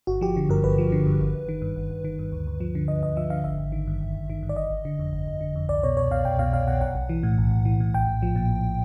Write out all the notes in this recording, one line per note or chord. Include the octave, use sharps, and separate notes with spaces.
G1 F#4
F3 G4
D3
G2 A#4
G1 B4
F3
D3
G2
G1
G1
D#3
G2
G1
G1
D#3
G2
D2
D2
F3
D3
D2 D#5
D2 D#5
F3 E5
D3 F5
G#1 E5
G#1
D#3
G2
G#1
G#1
D#3
G2
D5
G1 D#5
G1
D3
F2
G1
G1
D3
F2
C2 D5
B2 C#5
C2 C#5
B2 F5
C2 G5
B2 F5
C2 F5
B2 F#5
B1 F#5
B1
E3
A2
B1
B1
E3
A2
A#1 G5
A#1
F3
A#2
A#1